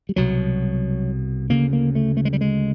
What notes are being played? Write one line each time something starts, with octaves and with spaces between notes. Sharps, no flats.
G3
C2 B2 F#3
D2 C#3 A#3
A#3
A3
A3
G#3
G3
G#3